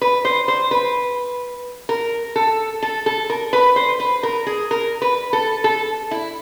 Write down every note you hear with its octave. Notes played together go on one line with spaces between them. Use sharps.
B4
C5
C5
B4
A#4
A4
A4
A4
A#4
B4
C5
B4
A#4
G#4
A#4
B4
A4
A4
E4